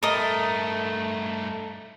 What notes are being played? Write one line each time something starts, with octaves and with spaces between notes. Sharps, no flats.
G2 A3 A4 A#4 D#5